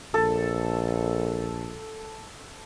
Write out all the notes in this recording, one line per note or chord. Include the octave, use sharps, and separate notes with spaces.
A#1 A4